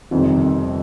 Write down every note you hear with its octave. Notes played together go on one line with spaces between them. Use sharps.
G1 F2 C3 D#3 G3